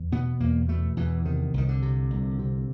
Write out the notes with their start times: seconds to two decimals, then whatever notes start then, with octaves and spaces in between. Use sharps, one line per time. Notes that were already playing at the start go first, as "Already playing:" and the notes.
Already playing: E2
0.12 B2 B3
0.40 E2 A#3
0.68 B2 A3
0.97 E2 E3
1.25 C3 D#3
1.54 C2 D#3
1.68 D3
1.82 C3
2.11 C2
2.39 C3